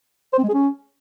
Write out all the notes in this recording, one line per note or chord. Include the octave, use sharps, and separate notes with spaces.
C5
C4
G#3
G#4
C#4